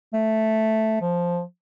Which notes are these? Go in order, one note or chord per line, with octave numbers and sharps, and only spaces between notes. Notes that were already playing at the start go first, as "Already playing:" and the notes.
A3
F3